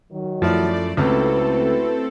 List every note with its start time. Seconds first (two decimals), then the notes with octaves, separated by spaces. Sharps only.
0.12 D#3 F#3
0.42 F#2 F3 A3 E4 D5
0.97 C#2 A3 C4 E4 F#4 A4 B4